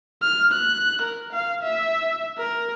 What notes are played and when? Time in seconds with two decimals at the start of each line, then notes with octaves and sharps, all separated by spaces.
0.22 F6
0.53 F#6
1.02 A#4
1.33 F5
1.63 E5
2.38 A#4